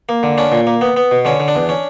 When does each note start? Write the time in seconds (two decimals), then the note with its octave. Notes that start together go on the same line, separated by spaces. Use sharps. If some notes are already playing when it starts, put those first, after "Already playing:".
0.09 A#3
0.23 D3
0.38 C#4 D4
0.52 A#2
0.67 A#3
0.81 B3
0.96 B3
1.11 B2
1.25 D3 C#4
1.40 D3
1.48 D4
1.55 E2
1.69 C#4